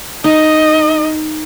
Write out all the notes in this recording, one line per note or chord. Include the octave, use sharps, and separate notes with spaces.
D#4 D#5